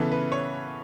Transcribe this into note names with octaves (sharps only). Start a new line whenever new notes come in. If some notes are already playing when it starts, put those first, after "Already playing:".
Already playing: C#3 E3 B3 A4
B4
C#5